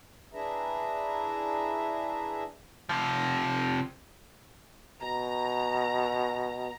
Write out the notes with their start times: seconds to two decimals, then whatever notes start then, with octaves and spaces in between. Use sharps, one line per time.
0.34 D4 E4 G#4 B4 E5 A#5
2.89 C3 F3
5.02 B2 A#5